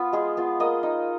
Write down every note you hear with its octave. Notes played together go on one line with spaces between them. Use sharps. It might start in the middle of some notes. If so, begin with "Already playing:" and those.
Already playing: B3 F4
G#3 G#4
B3 F4
A#3 D#5
D#4